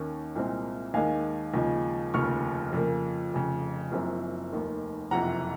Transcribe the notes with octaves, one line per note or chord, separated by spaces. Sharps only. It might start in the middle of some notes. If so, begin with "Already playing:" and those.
Already playing: D#2 D#3 A#3 C#4
C2 A#2 G#3 C4
D#2 D#3 G#3 F5 G#5
D#2 C#3 F3 G#3
F1 D#2 C#3 F3 C#6 F6
F2 C#3 F3 A#3
F1 F2 C#3
F#1 F#2 F3 C4
F1 D#2 D#3
F#1 F2 C3 F#5 A#5